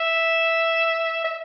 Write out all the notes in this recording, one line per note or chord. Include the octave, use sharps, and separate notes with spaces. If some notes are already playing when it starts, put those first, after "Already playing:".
Already playing: E5
E5